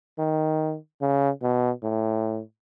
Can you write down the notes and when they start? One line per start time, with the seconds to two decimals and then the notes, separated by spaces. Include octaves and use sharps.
0.19 D#3
1.01 C#3
1.42 B2
1.83 A2